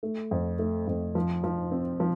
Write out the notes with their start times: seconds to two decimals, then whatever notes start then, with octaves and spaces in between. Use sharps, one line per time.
0.03 A3
0.31 F2
0.59 A3
0.87 F2
1.15 F3
1.44 F3
1.71 C4
2.00 F3